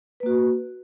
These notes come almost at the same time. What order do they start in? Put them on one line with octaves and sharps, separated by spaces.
B4 A#3 F#4